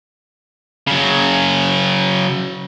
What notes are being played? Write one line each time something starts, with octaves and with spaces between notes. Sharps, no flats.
C#3 F#3